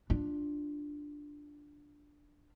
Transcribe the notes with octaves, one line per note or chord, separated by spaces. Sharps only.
D4 F4